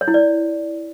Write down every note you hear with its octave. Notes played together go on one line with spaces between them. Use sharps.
C#5
E4
D5